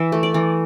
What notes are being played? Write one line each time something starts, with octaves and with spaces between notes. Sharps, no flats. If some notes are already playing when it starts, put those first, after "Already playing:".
Already playing: E3 E5
A3
D5
E3